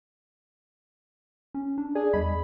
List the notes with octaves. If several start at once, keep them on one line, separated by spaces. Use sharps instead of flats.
C#4
D4
G#4 D5
E2 G3 D#5 B5